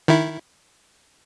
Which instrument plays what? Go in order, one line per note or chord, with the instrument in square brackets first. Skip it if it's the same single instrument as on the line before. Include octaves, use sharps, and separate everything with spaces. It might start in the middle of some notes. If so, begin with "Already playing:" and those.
[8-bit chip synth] D#3 E4